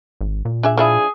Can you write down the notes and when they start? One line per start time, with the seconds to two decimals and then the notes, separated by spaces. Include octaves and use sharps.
0.21 G#1
0.45 A#2
0.63 D4 G#4 E5
0.77 F3 D4 E4 G#4